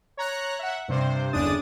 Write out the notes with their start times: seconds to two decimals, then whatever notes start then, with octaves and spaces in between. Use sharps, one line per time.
0.17 C#5 A#5 F#6
0.59 E5 F#5
0.88 G2 C3 C5
1.33 G1 E2 C#3 D4 D#6 A6